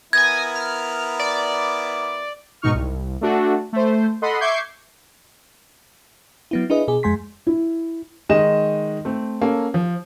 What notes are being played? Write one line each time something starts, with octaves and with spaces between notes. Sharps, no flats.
B3 E4 A#4 G#5 D#6 G#6 A#6
F6
D5
G#2 B2 D#4 C#6 F6
C2
A3 D4 F#4 A4
A3 C5
A4 D#5 F#5 B5 C6
E5 C#6 D6 G6 G#6 C7
F#3 B3 E4
D4 E4 G#4 B4 D#5
B2 G#4
F2 G#3 G#5 C6 B6
E4
D#3 G#3 D#4 D#5 E7
A3 C4
A#3 C#4 A4
F3